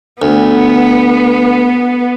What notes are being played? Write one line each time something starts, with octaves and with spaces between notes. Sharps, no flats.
D2 B3